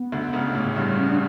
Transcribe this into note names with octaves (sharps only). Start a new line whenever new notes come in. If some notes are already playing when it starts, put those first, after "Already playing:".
Already playing: B3
D2 D3
C#2 C#3
A1 A2
G1 G2
C#4
D4